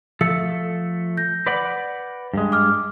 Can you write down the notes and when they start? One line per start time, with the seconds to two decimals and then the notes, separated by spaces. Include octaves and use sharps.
0.21 F3 A3 A4 C#7
1.17 G6 A#6
1.47 B4 D5 F#5
2.34 G2 G#3
2.52 D6 F6